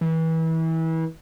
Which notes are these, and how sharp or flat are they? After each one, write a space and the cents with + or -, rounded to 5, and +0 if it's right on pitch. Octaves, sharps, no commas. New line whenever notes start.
E3 -30